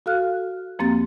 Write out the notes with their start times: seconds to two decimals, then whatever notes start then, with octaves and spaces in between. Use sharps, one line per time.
0.06 F#4 A4 F5 F6 F#6
0.79 E2 F3 A#3 C4 G4 A6